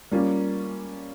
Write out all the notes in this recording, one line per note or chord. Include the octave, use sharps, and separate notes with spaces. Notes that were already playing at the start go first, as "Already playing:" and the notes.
G3 A#3 C#4 F4